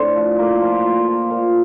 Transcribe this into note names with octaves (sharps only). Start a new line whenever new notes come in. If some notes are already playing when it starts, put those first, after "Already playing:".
Already playing: A2 C4 D4
F3
A2 A#3
F3
A#2
F3
A#2